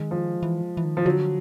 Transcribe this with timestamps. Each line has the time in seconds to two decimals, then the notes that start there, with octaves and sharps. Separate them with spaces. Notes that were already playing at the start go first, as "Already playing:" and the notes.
Already playing: D#3 G#3
0.11 F3
0.43 E3
0.77 E3
0.85 D#3
0.97 F3
1.06 D3 F#3